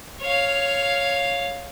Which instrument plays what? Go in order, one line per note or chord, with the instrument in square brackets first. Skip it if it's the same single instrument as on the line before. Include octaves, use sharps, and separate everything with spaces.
[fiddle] C#5 F5